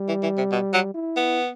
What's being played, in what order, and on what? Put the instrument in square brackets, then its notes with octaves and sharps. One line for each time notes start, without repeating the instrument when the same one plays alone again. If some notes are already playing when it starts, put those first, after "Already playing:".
Already playing: [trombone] G3
[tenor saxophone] E3
E3
C3
B2
F#3
[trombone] E4
[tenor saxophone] B3